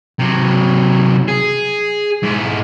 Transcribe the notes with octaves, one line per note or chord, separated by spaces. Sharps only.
C3 F#3
G#4
G#2 E4